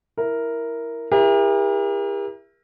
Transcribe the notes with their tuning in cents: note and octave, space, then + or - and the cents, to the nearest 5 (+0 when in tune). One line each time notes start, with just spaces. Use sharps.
E4 +0 A#4 +0
E4 +10 G4 +45 A#4 +30